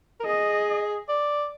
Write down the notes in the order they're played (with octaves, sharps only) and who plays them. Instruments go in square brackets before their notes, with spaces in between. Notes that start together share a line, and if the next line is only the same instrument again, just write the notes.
[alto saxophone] A#4
[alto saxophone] G#4 [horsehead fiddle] D#5
[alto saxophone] D5